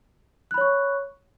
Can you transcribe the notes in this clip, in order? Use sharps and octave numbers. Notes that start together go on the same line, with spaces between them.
C#5 B5 C#6 F#6